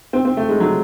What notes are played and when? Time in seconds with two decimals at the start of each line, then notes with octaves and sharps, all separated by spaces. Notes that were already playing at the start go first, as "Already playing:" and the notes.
0.13 C4
0.25 C4
0.37 A3
0.49 G#3
0.60 F#3